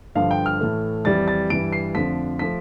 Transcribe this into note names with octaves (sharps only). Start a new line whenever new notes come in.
G2 D3 F3 F5
G5
F6
A2 E3 A3
F2 E3 G3 A6
A6
G2 E3 G3 D7
C7
F2 D3 F3 A3 B6
F3 A3 B6